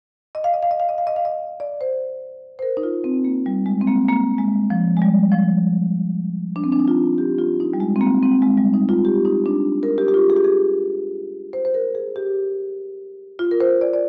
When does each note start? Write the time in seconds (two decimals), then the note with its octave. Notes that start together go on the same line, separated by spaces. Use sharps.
0.35 D#5
0.44 F5
0.54 D#5
0.63 F5
0.71 D#5
0.80 F5
0.89 D#5
0.98 F5
1.07 D#5
1.16 F5
1.25 D#5
1.60 D5
1.81 C5
2.59 C5
2.62 A#4
2.77 D#4
2.83 F4
3.04 C4
3.25 A#3
3.46 G3
3.66 G#3
3.81 C4
3.87 A#3
4.08 A#3
4.38 G#3
4.70 F3
4.97 G#3
5.02 G3
5.32 F3
6.56 D4
6.64 C4
6.72 D4
6.79 D#4
6.88 F4
7.18 G4
7.39 F4
7.60 D#4
7.73 G3
7.80 G#3
7.96 C4
8.01 A#3
8.23 C4
8.42 G#3
8.58 G3
8.74 D#4
8.89 F4
9.05 G4
9.25 D#4
9.46 D4
9.83 A#4
9.98 G4
10.08 G4
10.14 F4
10.30 G#4
10.36 G4
10.45 G#4
11.53 C5
11.65 C5
11.74 A#4
11.95 G#4
12.16 G4
13.39 F4
13.51 A#4
13.61 C5
13.81 D5
13.93 D5